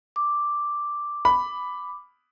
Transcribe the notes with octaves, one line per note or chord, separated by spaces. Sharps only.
D6
B5